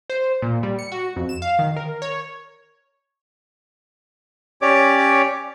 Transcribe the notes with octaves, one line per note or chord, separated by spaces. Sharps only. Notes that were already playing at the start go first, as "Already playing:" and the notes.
C5
A#2
G3
C#7
F#4
F2
E7
F5
D#3
A#4
C#5
C#4 G4 C#5 D5 D6